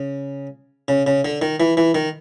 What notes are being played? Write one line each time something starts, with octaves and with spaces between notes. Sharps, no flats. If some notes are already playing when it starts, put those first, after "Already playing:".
Already playing: C#3
C#3
C#3
D3
D#3
E3
E3
D#3